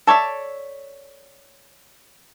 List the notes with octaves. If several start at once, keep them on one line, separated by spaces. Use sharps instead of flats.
A4 C#5 D5 E5